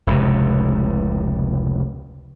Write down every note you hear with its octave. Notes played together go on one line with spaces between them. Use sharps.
F1 C#2 A2 C3